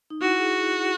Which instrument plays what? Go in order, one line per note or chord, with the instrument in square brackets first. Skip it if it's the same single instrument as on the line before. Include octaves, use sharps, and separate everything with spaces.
[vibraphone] D#4
[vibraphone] E4 [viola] F#4
[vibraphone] G#4